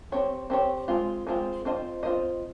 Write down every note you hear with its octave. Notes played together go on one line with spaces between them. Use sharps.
C4 G4 C#5
C4 G4 C#5
G#3 C4 F4
G#3 C4 F4
C4 F4 C5 D#5
C4 F4 C5 D#5